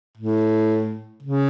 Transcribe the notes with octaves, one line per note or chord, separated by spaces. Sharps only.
A2
C#3